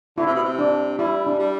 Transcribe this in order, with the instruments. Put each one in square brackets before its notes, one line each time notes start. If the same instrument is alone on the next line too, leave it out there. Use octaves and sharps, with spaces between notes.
[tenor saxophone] D3 [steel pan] E4
[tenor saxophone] C3
B2
C3
[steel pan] D4
[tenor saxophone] G3 [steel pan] E4
[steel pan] D4
[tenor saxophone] G3